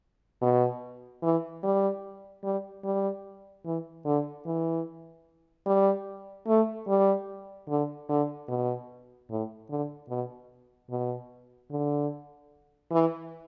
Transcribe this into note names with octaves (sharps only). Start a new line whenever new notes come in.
B2
E3
G3
G3
G3
E3
D3
E3
G3
A3
G3
D3
D3
B2
A2
D3
B2
B2
D3
E3